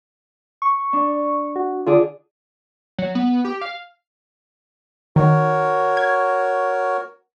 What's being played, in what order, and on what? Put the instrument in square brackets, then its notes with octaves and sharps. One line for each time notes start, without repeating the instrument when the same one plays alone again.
[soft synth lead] C#6
[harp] D4
[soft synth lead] F#4
[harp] D3 G#4 D5 [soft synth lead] F4
[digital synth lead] F#3
B3
G4
F5
[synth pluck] D#3 [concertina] F#4 A#4 C#5
[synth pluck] G#6